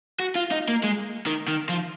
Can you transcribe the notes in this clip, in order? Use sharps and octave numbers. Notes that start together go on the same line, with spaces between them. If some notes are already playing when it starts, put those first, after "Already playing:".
F#4
F4
D#4
A#3
G#3
D#3
D#3
F3